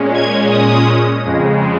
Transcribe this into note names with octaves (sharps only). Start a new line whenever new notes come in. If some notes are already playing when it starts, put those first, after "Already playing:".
Already playing: A#2 G#3 C#4
G#6
D#6
F2 C#3 G#3